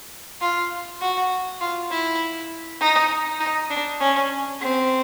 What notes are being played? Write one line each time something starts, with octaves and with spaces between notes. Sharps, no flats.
F4
F#4
F4
E4
D#4
D#4
D4
C#4
C4